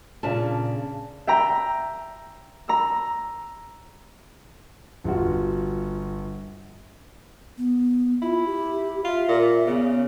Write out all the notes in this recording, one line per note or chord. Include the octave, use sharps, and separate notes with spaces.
A#2 C#3 D4 F4 A5
E5 G5 A#5
A#5 E6
G1 F4 F#4
B3
E4 F4
G4
F4 E5
A#2
C#3 B3